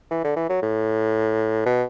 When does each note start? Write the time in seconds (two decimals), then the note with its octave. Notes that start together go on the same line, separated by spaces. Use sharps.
0.11 E3
0.24 D3
0.36 E3
0.49 F#3
0.62 A2
1.65 B2